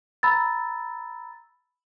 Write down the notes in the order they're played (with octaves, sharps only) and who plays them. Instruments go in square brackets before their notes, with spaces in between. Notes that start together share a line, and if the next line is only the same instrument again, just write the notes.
[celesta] A#5 B5 E6 A6